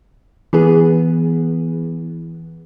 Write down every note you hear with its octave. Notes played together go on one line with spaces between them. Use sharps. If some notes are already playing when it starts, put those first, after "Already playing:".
E3 B3 G#4